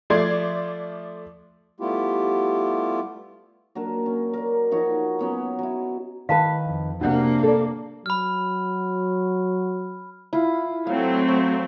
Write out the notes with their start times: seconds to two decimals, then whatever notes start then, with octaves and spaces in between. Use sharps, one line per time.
0.10 F3 A3 D5 C6 G#6 C7
1.80 G3 A3 B3 E4 F4 G4
3.75 F#3 A#3 D4 A#4
4.06 C#4
4.33 A#4 D5
4.71 F3 D#4 F#4 C#5
5.19 F#3 B3 C#4
5.59 F#3 E4
6.29 D#3 B4 F5 A5
6.66 F2
7.01 C3 A#3 D4 F#4 F#5
7.43 A4 D5
8.06 F#3 B5 F6
10.33 E4 F4
10.87 F#3 A3 C4 F5
11.29 C#6